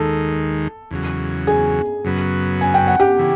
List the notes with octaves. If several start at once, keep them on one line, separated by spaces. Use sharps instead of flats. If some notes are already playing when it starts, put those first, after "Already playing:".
Already playing: D#2 D#3 G#3 A4 A5
E2 C#3 F#3
G#4 G#5
F#2 C#3 F#3 B3
G#5
G5
F#5
G4 G5
C#3 E3